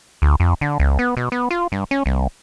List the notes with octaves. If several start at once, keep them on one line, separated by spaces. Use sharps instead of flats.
D2
F2
D3
C#2
B3
B2
B3
F4
G2
C#4
C2